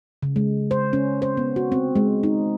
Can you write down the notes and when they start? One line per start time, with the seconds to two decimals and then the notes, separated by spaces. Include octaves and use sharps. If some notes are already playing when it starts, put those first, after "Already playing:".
0.23 C#3
0.36 G#3
0.71 C5
0.93 C#4
1.22 C5
1.37 B3
1.56 F#4
1.72 C4
1.96 G#3
2.23 D#4